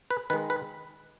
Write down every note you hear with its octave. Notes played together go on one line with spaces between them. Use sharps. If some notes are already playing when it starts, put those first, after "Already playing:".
B4
D#3 G#3 B4
B4